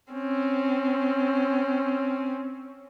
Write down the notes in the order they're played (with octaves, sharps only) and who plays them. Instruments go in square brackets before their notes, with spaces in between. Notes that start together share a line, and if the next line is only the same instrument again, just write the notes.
[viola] C4 C#4